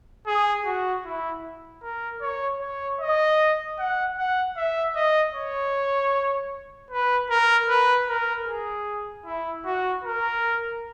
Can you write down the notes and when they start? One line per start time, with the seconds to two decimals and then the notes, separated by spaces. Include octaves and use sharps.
0.27 G#4
0.65 F#4
1.05 E4
1.83 A#4
2.21 C#5
2.61 C#5
3.00 D#5
3.79 F#5
4.18 F#5
4.57 E5
4.95 D#5
5.35 C#5
6.91 B4
7.30 A#4
7.69 B4
8.09 A#4
8.47 G#4
9.26 E4
9.65 F#4
10.04 A#4